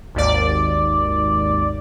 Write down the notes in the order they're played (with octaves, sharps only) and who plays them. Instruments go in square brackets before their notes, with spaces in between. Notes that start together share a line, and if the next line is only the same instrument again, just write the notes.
[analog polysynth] G#1 D#2 D5